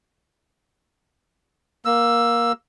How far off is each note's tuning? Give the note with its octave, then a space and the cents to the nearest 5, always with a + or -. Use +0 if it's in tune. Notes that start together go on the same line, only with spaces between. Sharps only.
A#3 +15 E6 +5